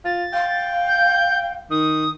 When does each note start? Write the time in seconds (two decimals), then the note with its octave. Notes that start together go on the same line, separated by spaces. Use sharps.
0.05 F4 A6
0.33 F5 G5
0.87 G6
1.70 D#3 D#6